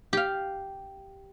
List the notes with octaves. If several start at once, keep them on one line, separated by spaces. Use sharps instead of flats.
G4 F5